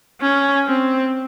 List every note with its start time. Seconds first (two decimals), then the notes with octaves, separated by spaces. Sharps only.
0.21 C#4
0.67 C4